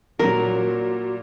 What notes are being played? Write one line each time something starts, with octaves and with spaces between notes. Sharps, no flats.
A#2 F#3 G3 F#4 A#4